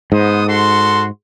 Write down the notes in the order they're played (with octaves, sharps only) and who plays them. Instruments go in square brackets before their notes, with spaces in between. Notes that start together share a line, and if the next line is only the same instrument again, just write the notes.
[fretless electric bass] G#2 [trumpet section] B3 C5 D#6
[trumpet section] F#4 A4 C6